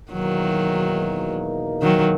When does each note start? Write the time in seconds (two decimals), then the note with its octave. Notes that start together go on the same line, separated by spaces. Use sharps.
0.11 E2 B2 D#3 F#3 A#3 D#4 A#4
1.82 D#3 F#3